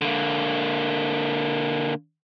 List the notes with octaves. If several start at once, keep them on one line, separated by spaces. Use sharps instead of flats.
D3 A#3